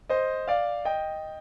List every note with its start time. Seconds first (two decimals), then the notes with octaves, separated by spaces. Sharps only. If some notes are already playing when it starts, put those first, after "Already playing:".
0.09 C5 D#5
0.48 D5 F5
0.85 D#5 G5